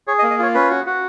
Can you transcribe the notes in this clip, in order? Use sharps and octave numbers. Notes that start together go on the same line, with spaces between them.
G#4 C#5
D#5
A#3
D#5
F4 C#5
C#4 B4
F#4
F#4